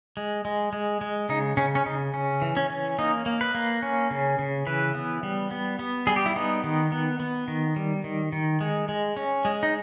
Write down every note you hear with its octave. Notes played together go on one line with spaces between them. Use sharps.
G#3
G#3
G#3
G#3
C#3 D#4
C#3 C#4
C#4
C#3 D#4
C#4
E3
C#4
C#4
A#3 D#4
A#3
B4
A#3
C#4
C#3
C#3
E3 B4
B3
G3
B3
B3
G3 G#4
G4
E4
B3 D#4
D#3
B3
B3
D#3
G3
D#3
D#3
G#3
G#3
C#4
G#3
D#4